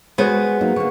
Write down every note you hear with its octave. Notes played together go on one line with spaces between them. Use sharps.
G#3 B3 F#4 G#4 C5 C#5
F#3 A#3 D#4
D3 A#3 C#6